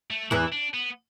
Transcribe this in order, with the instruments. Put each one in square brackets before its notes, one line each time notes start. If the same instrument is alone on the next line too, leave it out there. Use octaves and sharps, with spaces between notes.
[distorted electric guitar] A3
[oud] E2 E3 [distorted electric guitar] E4
[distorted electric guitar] D4
B3